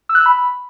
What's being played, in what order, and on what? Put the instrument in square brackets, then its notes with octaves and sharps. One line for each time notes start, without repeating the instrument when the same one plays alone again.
[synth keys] E6
F#6
E6
B5